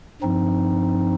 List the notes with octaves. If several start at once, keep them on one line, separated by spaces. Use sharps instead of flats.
G2 F3 C4 D#4